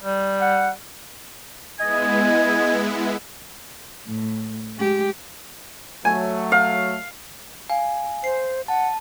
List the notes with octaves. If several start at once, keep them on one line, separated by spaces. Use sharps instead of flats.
G3
F#5
G#3 B3 E4 D#5 G#5
A2
G#3 G4
F#3 A3 G#5
F5
F5 G#5
C5 C7
F#5 A5